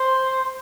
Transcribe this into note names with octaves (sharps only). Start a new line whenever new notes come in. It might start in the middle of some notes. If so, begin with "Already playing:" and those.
Already playing: C5